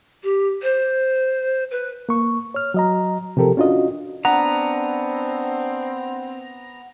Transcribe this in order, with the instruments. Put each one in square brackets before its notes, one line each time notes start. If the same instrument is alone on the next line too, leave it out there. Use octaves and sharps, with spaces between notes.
[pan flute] G4
C5
B4
[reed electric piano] A#3 C#6
C#5 F6
F#3 D#5 A#5
C3 F3 G4 A4 A#4
C#4 D4 F4 F#4 D#5
[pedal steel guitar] B3 A#5 [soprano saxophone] C4 [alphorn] D4 [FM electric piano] F#5